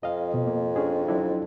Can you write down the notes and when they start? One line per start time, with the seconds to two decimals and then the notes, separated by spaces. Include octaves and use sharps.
0.03 F2 D#5 F5
0.34 B2
0.47 A#3
0.76 C#4 D4 G#4
1.08 F#3 D4 E4